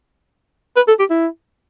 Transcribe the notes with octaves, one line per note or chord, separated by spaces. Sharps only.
B4
A4
G4
E4